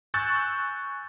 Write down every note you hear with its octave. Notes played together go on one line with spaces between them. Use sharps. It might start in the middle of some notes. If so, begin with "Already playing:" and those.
G#5 C#6 E6 F#6 G6 A6